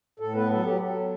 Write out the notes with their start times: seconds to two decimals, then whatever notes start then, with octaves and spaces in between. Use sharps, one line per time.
0.20 A2 A4
0.35 B3 B4
0.50 F#3 A4
0.64 F#3 G4
0.79 F#3 A4
0.95 B3